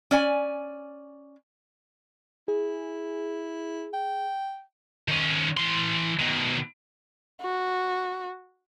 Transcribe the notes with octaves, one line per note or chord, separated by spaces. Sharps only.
C#4 D5 G#5
E4 G#4
G5
D#3 C#4
E3 C6
B2 D#3
F#4